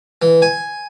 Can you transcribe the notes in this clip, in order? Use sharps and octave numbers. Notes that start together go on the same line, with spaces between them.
E3
G#5